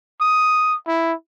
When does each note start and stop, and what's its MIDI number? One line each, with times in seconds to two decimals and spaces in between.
0.21 0.75 87
0.88 1.13 64